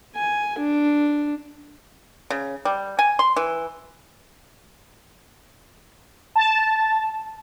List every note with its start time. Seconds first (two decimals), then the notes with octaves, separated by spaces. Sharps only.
0.16 G#5
0.58 D4
2.30 C#3
2.65 G3
2.99 G#5
3.19 C6
3.37 E3
6.36 A5